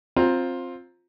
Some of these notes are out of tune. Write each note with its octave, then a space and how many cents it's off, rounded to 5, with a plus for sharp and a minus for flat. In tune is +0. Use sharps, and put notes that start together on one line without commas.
C4 +10 F4 +10 A#5 +0